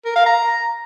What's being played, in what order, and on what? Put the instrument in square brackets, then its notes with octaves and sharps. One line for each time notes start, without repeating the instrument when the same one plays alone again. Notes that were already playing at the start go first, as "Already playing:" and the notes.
[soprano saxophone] A#4
F5
A#5